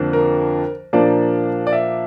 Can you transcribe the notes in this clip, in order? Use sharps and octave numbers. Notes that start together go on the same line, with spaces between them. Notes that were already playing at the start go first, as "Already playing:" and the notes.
Already playing: F2 D3 F3 A#3 D4
A#4
A#2 F3 A#3 D4 D5
D5
E5